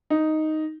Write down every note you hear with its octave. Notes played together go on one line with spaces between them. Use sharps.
D#4